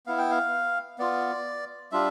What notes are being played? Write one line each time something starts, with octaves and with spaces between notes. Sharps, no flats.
B3 E4 F5
G5
F5
B3 F4 D5
G3 D4 F4 E5